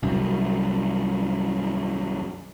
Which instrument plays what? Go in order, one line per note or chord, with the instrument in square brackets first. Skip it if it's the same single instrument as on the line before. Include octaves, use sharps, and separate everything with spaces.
[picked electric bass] C2 F#2